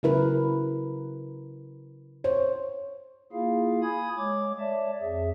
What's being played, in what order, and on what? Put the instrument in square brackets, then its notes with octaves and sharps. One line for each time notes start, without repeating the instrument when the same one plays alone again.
[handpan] C#3 F#3 E4 A#4 B4
C5 C#5
[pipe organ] A#3 E4 F4 G#4 F5
G#5 B5 D#6 G#6
G#3 C#5 D6
C#5 D5 E5 A5
F2 G#4 E5